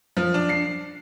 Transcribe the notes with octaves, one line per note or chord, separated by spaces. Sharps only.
F3
D4
C7